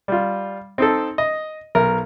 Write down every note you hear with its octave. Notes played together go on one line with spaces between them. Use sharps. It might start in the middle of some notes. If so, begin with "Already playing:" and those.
G3 F4
C4 D#4 A4
D#5
B1 A#4